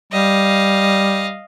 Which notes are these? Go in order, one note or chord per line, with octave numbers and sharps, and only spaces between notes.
G3 D#5 F5